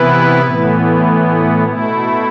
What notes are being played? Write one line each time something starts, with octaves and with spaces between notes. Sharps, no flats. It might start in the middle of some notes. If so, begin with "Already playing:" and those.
Already playing: C3 E3 B3 E4 B4
A2 E3 B3
B2 A3 E4